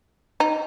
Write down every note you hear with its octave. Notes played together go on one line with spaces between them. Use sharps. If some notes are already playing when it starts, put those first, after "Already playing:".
D#4